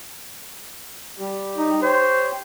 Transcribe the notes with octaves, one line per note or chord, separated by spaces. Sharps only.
G3 G4
D#4
G4 C5 C#5